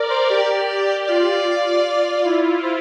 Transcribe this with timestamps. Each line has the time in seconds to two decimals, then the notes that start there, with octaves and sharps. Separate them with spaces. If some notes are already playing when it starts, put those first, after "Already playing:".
Already playing: A#4 D5
0.10 C5
0.30 G4 D5
1.07 F4 D5
1.47 F4
2.24 E4
2.63 C5